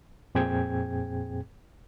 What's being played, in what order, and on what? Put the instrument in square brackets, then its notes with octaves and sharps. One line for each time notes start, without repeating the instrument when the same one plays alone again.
[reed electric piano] F2 A#2 C4 G#4 G5 G#6